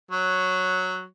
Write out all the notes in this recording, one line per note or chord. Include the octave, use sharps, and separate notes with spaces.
F#3 C#5